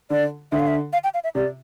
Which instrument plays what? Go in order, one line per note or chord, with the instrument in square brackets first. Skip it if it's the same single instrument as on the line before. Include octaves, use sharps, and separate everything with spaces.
[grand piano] D3 [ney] D5
[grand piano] D3 [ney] E5
[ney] F5
E5
F5
G5
F5
E5
[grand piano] C3 [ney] D5